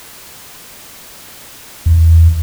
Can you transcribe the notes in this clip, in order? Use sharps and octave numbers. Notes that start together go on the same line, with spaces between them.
E2